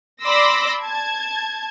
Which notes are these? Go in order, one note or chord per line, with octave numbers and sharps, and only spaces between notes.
D5 B5 C6 D6 E6 A#6
A5 G#6